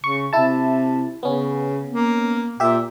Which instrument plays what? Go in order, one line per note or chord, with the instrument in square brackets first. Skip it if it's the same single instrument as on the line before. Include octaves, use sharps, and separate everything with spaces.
[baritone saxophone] C#3 [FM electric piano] C#6
[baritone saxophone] C3 [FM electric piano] E4 A5
[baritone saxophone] C#3 [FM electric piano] B3 C#4
[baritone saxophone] A#3
[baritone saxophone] A#2 [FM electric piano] G4 E5